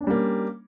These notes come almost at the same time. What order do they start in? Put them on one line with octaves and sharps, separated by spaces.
D4 C#4 G3 A#3